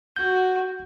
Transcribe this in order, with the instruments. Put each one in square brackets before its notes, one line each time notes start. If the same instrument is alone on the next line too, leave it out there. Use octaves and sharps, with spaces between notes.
[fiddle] F#4 [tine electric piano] G6